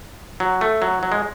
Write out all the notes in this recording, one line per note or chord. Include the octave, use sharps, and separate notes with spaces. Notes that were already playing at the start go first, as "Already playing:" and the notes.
F#3
A3
F#3
F#3
G#3